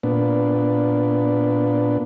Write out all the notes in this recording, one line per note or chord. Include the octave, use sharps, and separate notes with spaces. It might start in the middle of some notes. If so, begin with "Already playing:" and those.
A#2 B3 D4